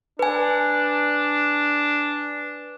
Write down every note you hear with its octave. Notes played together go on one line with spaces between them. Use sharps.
D4 B4 G#5